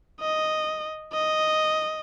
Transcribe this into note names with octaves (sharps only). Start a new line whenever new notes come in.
D#5
D#5